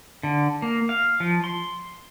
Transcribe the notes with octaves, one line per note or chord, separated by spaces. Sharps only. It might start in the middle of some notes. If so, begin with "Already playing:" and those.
D3
A#3
F5
F3
C6